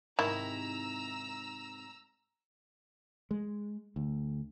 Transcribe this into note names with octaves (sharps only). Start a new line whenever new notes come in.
G#2 C3 D#3 E4 A#5 E6
G#3
D2